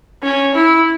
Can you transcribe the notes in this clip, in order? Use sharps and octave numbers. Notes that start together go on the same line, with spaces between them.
C#4
E4